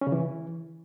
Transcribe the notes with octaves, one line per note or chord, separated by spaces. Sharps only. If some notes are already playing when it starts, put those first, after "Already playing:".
C#4
C#3
E3